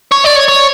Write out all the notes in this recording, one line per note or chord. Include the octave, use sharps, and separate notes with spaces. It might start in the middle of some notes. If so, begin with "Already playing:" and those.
C#5
D5
C#5
C#5